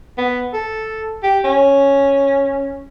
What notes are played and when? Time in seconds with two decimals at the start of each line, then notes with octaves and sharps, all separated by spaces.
0.18 B3
0.53 A4
1.23 G4
1.44 C#4